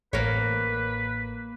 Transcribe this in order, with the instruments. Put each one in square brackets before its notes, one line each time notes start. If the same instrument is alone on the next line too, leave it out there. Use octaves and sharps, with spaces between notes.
[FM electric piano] A1 [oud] A#3 A#4 C#5 [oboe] B4